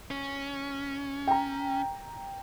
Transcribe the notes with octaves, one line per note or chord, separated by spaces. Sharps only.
C#4
G5 A#5